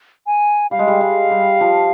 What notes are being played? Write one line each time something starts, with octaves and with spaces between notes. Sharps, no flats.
G#5
G3 F5
G#3
G3
G#3
G3
F3